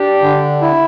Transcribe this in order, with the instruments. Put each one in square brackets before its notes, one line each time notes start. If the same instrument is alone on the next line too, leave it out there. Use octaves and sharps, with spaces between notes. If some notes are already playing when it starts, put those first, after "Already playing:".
Already playing: [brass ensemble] D4 G4
[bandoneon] D3
E4